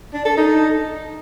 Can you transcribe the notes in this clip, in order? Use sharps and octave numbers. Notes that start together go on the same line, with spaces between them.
D4
A4
D#4